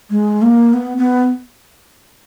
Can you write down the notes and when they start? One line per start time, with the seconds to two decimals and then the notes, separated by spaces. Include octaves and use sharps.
0.10 G#3
0.42 A#3
0.74 B3
0.98 B3